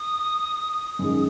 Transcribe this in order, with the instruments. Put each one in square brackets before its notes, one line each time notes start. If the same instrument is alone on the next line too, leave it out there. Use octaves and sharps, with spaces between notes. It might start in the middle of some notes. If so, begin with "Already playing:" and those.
Already playing: [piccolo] D#6
[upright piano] F#2 D#3 G#3